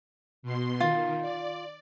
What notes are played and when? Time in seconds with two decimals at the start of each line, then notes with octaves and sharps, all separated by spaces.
0.43 B2 C6
0.80 D#3 F4
1.21 D5